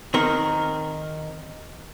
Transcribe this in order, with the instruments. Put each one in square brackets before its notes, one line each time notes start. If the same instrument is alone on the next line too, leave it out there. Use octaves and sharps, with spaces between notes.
[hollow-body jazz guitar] D#3 C4 A#4